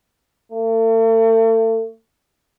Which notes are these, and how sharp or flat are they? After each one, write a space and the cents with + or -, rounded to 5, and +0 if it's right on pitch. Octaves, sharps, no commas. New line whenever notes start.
A3 +40